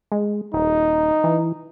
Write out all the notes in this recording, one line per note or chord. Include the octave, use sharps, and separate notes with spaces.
G#3
D#1 D#4
E3